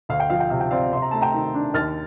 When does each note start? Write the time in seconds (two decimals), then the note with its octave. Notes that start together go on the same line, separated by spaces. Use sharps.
0.09 D2 F5
0.20 G5
0.30 F3 F5
0.40 G5
0.50 C3 F5
0.60 G5
0.71 C4 D5 F5
0.93 C3 C6
1.02 A#5
1.11 A3 A5
1.21 G5 A#5
1.34 D#3
1.55 D4
1.74 D#2 F6 A6